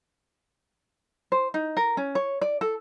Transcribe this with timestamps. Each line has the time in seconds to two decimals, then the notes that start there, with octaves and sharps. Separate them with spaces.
1.32 C5
1.54 D#4
1.77 A#4
1.97 C#4
2.15 C#5
2.41 D5
2.61 A4